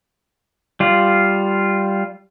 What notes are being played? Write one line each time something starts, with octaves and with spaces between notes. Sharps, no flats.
G3 F4